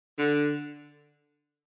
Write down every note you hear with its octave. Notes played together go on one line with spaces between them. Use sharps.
D3